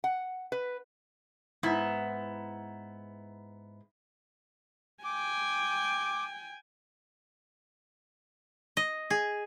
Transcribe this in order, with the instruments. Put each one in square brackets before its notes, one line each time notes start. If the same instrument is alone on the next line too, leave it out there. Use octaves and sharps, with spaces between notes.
[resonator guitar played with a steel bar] F#5
B4
G#2 B3 E4
[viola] G5 G#5 [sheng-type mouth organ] D6
[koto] D#5
G#4